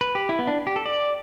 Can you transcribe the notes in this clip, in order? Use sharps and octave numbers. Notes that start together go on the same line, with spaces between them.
B4
G4
E4
B3
D4
G4
A4
D5